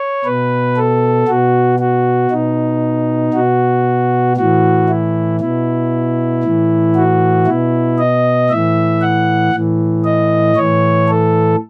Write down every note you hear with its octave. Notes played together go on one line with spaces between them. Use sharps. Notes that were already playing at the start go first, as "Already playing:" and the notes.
Already playing: C#5
B2 B4
A4
B2 F#4
F#4
B2 D#4
B2 F#4
A2 E3 F#4
E4
B2 E4
A2 E3
F#4
B2 E4
D#5
A2 E3 E5
F#5
A2 E3
D#5
A2 E3 C#5
A4